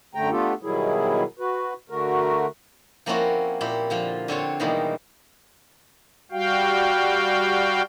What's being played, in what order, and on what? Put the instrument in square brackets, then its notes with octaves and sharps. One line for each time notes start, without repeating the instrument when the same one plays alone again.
[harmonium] F#2 D3 A3 G5 A#5
A3 B3 D4 F4 G4 A4
B2 D#3 F#3 G3 E4 G#4
F#4 B4
D3 A3 F#4 A#4
[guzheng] F3 A#3 C4 C#4 E4 F#4
A#2 E4 G4
D3 F3 F4
D3 C4 F4 C#5
B2 D#3 E3 G3 G#3 A#3
[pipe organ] G3 F#4 F5 G5